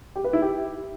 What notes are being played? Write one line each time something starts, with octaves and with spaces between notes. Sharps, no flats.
G4
B4
E4
G4